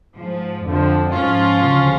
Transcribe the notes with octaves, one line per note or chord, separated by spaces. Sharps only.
G#2 F3
F2 D3 F3
G#2 F3 C#4 F4
D2 C#3 F3